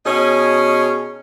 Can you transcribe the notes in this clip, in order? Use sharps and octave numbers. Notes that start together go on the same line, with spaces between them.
B2 C#4 D#4 G#4